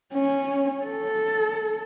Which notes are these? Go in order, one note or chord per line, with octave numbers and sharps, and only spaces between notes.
C#4
A4